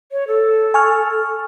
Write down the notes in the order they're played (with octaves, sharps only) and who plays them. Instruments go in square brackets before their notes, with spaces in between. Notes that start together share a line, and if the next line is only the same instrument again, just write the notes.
[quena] C#5
A4
[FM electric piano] G#5 C#6 F6